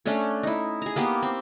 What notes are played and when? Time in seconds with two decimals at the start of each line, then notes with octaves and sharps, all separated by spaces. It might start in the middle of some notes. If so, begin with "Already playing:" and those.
0.06 A3 C#4 D4 C#5
0.43 D#4 E4
0.82 G#4 A#5
0.96 A#3 B3 G4
1.22 C4